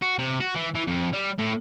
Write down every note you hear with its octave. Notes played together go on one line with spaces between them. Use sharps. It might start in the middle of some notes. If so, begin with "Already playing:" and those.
F#4
C3
F#4
E3
E3
F2
G3
A2